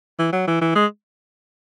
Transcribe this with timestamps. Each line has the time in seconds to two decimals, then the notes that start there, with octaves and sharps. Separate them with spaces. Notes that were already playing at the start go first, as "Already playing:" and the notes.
0.19 E3
0.33 F#3
0.48 E3
0.61 E3
0.76 G#3